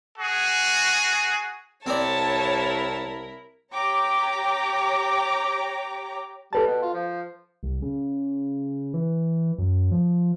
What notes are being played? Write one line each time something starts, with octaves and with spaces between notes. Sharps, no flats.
F#4 G#4
C2 C4 E4 A#4 C#5 D5 A5
G4 C#5 G5 A#5 D6
G3 A4 B4 A5
B2
F4
F3
C2
C#3
E3
F#2
F3